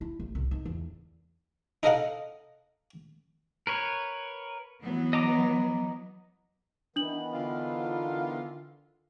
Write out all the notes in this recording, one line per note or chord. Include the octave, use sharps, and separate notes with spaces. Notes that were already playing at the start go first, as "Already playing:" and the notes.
E4
A1
C2
D#3
E2
D#4 A4 A#4 D#5 F5 F#5
A#4 B4 C#5
E3 F#3 B3
D#5 A#5 D6
D#3 E3 B3 D4 F#7
D3 F4